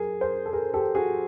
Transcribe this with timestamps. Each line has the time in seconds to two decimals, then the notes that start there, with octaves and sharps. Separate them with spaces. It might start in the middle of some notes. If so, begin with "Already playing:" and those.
Already playing: F#2 G#4 A#4
0.21 A#4 C5
0.46 A4
0.53 G#4 A#4
0.74 G4 A4
0.95 F#4 G#4